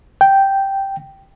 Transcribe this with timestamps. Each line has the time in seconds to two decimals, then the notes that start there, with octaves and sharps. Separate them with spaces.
0.21 G5